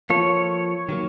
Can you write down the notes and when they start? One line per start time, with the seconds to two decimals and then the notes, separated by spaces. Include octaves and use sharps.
0.10 F3 A#3 F4 A4 C#5
0.89 D#3 F#3 A#3